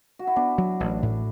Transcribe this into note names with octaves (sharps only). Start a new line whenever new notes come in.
F#4
E4
B3 D4
F#3
A1 D4
A2